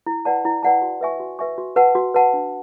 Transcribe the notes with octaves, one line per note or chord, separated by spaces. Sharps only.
E4
B4 D5 F#5 A5
E4
B4 D5 F#5 A5
F#4
B4 E5 G#5 C#6
F#4
B4 E5 G#5 C#6
F#4
B4 F#5 A5
F#4
B4 F#5 A5
D4